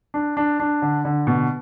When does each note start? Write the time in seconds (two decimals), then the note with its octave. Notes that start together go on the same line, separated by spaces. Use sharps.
0.14 D4
0.37 D4
0.60 D4
0.82 D3
1.05 D3
1.27 B2